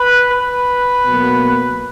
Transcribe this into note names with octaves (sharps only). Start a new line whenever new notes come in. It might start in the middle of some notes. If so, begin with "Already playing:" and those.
Already playing: B4
B4
B2 F#3 A#3